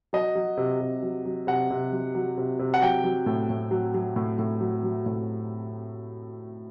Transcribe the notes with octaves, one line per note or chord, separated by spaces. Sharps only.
F#3 D#5
F#3
C3
C3
F#3
F#3
C3 F#5
C3
F#3
F#3
C3
C3
F#5
F#3 G5
F#3
A2
A2
F#3
F#3
A2
A2
F#3
F#3
A2